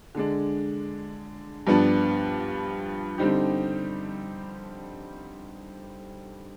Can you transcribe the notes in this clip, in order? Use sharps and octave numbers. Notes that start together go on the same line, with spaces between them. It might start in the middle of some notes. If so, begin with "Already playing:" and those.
D3 G#3 D4
G2 F3 B3 D4
D3 G3 C4 D#4 G4